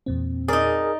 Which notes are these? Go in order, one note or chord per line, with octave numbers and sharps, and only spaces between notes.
E2 A#2 C4
D#4 G#4 A#4 D5